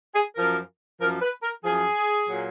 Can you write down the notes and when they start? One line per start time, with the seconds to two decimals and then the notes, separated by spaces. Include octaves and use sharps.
0.14 G#4
0.36 F#2 F3 A#4
1.00 F#2 F3 A#4
1.21 B4
1.43 A#4
1.64 F#2 F3 G#4
2.28 A#2 F#3